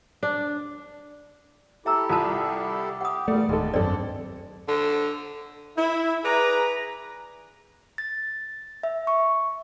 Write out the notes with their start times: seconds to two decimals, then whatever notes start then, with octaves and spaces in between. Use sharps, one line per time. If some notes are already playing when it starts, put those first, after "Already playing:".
0.23 D4
1.86 E4 G4 A4 E5 A#5 E6
2.09 C2 F4 A5 E6
3.01 G4 F#5 D#6
3.28 E2 A#2 G3 A3 D5
3.49 D1 D#2 G#3 A4
3.74 G#1 F#2 C4 D4 A4 D5
4.68 D3
5.77 E4
6.25 G#4 B4 D5 A#5
7.98 A6
8.83 E5
9.07 C#6